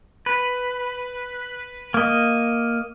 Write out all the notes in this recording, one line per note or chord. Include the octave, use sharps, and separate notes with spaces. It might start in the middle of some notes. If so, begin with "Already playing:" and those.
B4
A#3 D#5